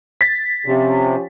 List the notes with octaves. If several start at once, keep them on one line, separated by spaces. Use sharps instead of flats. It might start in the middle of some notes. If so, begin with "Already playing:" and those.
A6 B6
C3 F3 C#4 G4